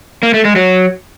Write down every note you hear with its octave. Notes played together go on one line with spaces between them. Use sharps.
A#3
A3
G#3
F#3